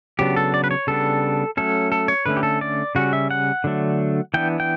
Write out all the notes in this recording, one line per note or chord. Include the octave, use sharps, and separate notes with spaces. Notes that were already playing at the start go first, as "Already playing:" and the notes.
C#3 F#3 B3 D4 G4
A4
D5
B4
C#5
C#3 G3 B3 D4 A4
F#3 A3 C#4 A4
A4
C#5
D3 A3 C#4 B4
G4
A4
D5
C#3 G3 C#4 F#4
E5
F#5
D3 F#3 A3 D4
E3 B3 D4 G5
G5